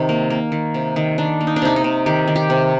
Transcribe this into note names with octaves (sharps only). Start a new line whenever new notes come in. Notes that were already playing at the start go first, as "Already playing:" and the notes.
Already playing: C3 D#3
A#3
A#3
D#3
C3
D#3
D#3 D4
A#3
D#4
D4
C3 D#4
D#4
C3
D#3 G4
D#3
G4
C3